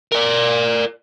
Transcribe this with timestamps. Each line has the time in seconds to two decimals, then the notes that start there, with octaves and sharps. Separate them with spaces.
0.12 A#4 D5